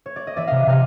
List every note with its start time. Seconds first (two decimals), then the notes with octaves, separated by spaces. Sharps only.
0.06 C#5
0.16 D5
0.27 D#5
0.36 E3 D5 E5
0.47 C3 D#5 F5
0.66 C3 D#5 F5